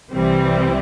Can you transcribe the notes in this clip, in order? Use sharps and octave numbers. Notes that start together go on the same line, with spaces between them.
C2 C3 E3 G3 C4